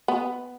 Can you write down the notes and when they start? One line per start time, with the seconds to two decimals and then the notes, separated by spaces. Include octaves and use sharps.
0.08 B3